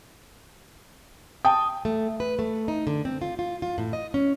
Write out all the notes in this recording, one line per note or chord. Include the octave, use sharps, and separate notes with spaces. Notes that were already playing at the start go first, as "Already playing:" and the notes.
G5 A5 D#6
A3
B4
A3
D#4
D3
C4
F4
F4
F4
A2
D#5
C#4